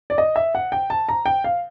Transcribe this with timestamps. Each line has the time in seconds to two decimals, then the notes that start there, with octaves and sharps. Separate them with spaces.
0.10 D5
0.18 D#5
0.36 E5
0.55 F#5
0.72 G5
0.90 A5
1.09 A#5
1.26 G5
1.44 F5